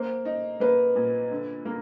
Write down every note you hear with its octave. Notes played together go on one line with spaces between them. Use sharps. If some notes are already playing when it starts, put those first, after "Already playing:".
Already playing: A#3 C5
D#4
A#3 B4
A#2
D3
A#3